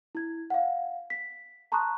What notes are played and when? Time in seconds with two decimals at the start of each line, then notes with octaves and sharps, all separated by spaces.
0.15 E4 G#6
0.50 F5 F#5
1.10 B6
1.72 A5 A#5 C6 C#6 D#6 F#6